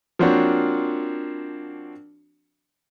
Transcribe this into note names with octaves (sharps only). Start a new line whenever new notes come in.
F3 A#3 C4 D4 F#4 C#5